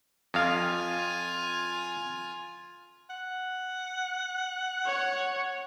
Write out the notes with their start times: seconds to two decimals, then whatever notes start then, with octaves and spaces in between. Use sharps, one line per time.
0.34 F2 F4 F5 G#5
3.10 F#5
4.86 C#5